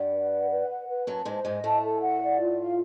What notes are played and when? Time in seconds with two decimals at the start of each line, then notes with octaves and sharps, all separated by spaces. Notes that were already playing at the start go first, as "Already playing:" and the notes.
Already playing: G2 G3 F#5
0.13 B4
0.31 F#5
0.50 B4
0.69 F#5
0.88 B4
1.07 F#2 F#3 A5
1.25 G#2 G#3 C5
1.45 G#2 G#3 D#5
1.64 A2 A3 A5
1.83 A4
2.01 F#5
2.21 D5
2.41 F4
2.60 F5